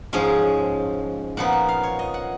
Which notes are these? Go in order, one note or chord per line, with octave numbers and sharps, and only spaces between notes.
G#2 F3 G#3 C#4 G#4
A#2 F3 B3 D#4 F#5
F#5
F5
C#5
D#5
F#5